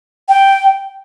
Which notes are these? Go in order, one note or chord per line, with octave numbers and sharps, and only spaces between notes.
G5